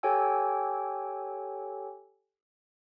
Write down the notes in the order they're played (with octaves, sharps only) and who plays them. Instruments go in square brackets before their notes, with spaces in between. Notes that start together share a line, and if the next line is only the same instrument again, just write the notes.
[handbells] G4 A4 C#5 G5 G#5 E6